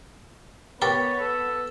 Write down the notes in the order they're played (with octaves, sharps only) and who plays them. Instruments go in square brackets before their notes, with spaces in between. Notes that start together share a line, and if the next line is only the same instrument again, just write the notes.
[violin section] B3 [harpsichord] G4 A#4 B4 [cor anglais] C#5 [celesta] A6
[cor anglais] A4